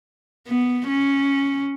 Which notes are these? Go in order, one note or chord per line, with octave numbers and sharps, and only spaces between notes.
B3
C#4